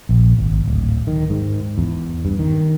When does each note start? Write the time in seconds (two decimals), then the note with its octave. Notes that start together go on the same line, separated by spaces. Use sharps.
0.09 A#1
0.39 G#1
0.68 D1
1.07 D#3
1.30 G#2
1.78 E2
2.25 G2
2.39 D#3